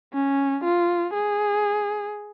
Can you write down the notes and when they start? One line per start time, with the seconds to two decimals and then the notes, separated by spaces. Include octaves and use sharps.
0.13 C#4
0.64 F4
1.14 G#4